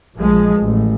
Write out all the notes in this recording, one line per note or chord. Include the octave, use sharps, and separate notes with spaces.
A#1 F3 G#3
A1